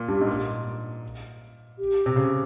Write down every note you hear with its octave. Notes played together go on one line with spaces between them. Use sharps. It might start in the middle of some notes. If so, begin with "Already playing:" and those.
Already playing: A#2
G2 G4
G#2
A#2
G4
C3
C#3